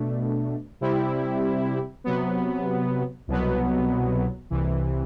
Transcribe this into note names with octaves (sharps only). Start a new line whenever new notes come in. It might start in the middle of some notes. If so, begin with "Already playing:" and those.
Already playing: B2 A3 D4
C3 G3 C4 E4 G4
C3 F#3 B3
C2 B2 F#3 B3
C2 C3 E3